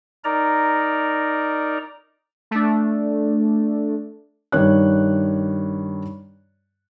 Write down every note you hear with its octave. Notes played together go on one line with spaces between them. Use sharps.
D#4 A#4 D5 A#5
A3 D4
G2 D#3 C#5 F#6